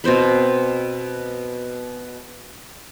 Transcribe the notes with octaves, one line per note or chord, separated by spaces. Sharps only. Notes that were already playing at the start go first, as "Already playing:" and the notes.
B2 C4 C5 B5